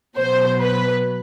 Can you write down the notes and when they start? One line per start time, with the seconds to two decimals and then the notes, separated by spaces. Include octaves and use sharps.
0.16 B2 F#3 C5
0.61 B4